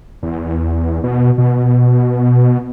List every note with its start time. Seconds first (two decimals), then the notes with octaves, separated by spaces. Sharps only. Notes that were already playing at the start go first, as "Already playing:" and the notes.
0.23 E2
1.04 B2
1.38 B2